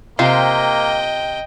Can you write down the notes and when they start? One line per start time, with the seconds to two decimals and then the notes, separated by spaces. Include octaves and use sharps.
0.19 C3 A#3 F4 C5 D#5 G5